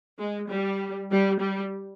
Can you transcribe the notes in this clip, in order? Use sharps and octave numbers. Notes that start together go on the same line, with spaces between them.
G#3
G3
G3
G3